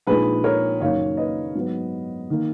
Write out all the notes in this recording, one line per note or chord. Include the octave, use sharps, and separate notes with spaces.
A#1 A#2 G#3 D#4 G#4 B4
A#4 C#5
F#1 F#2 D#3 A#3 D#4 C#5 F5
B4 D#5
G#2 F#3 B3
D#3 A#3